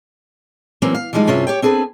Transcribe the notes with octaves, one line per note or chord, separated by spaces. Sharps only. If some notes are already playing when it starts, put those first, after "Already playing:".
E3 F#3 A#3 C4 C#4
F5
E3 F3 G3 G#3 D#4
G2 C3 C#4 F4 G#4 E5
G4 C#5 G5
C4 D4 G#4 A4 B4